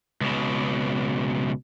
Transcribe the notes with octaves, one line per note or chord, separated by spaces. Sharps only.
C#2 B2